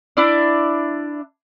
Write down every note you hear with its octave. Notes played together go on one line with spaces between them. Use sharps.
D4 E4 D5